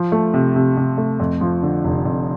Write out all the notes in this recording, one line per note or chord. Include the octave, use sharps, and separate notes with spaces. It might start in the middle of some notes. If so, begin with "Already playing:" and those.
Already playing: F3
A3
C3
C3
C3
A3
F2
F3
D3
F1
F2